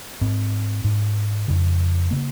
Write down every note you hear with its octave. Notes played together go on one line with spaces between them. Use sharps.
G#2 C4
G#2
F2 C#3
C#3 A#3